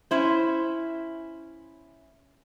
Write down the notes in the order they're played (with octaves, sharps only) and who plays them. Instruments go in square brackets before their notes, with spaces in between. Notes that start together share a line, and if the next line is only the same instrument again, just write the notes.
[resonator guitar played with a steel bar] C#4 E4 C5